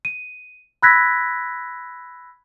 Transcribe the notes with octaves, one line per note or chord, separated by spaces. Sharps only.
D#7
B5 E6 F#6 G#6 A#6 B6